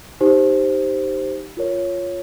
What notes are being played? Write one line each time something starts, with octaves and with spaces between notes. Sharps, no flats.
D#4 G4 C5
F4 A#4 C#5